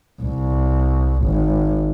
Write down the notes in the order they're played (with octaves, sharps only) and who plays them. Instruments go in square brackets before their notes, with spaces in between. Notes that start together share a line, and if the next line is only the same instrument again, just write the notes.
[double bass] C2
G#1